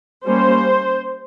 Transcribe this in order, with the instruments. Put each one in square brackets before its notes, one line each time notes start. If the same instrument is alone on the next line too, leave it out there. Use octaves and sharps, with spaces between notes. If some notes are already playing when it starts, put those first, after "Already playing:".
[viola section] G3 A#3 C#4 C5